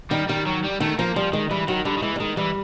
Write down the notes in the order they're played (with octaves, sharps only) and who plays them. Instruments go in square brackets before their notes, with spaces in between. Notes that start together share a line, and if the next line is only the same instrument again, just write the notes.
[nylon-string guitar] D#3 [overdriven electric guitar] G3
[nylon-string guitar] D#3 [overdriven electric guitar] G3
[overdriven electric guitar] F#3
G3
[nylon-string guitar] D#3 [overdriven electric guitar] A3
[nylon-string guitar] F3 [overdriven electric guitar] A#3
[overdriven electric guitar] F3 [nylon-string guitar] G3
[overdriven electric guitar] D#3 [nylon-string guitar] G#3
[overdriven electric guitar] E3 [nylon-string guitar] G3
[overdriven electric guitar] D#3 [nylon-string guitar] F#3
[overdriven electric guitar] D3 [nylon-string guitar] G3
[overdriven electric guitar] D#3
[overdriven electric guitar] E3 [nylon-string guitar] G#3
[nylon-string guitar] G3
[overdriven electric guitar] D#3 [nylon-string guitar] G#3
[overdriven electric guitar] E3 [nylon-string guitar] G3